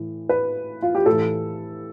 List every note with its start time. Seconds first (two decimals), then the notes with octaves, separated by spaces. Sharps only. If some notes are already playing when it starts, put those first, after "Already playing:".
Already playing: A2 E3
0.29 B4
0.82 F4
0.95 G4
1.06 A2 E3 A4